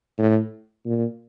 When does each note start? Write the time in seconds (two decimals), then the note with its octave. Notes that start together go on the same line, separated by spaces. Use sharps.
0.18 A2
0.86 A#2